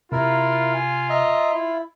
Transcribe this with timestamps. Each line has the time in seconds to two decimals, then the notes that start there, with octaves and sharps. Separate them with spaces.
0.12 C3 E4 F4 A#4
0.74 G#5
1.09 D#5 E5 A#5
1.53 E4